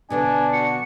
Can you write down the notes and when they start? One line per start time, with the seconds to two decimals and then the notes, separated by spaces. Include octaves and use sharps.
0.10 B2 D3 F3 D4 G#5
0.53 F#4 C#7